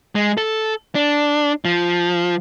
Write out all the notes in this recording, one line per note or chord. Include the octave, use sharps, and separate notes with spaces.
G#3
A4
D4
F3